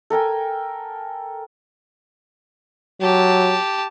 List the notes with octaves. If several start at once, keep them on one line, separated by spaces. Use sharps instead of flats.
A4 A#4 G5 G#5
F#3 G4 A5